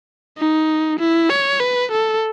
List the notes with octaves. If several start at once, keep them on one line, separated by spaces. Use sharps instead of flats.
D#4
E4
C#5
B4
A4